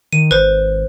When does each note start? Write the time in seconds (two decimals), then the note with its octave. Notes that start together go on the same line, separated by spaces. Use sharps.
0.13 D#3 D#7
0.31 G#1 B4 C5